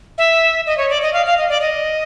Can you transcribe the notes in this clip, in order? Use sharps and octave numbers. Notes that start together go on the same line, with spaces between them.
E5
D#5
C#5
D5
D#5
F5
F5
D#5
D5
D#5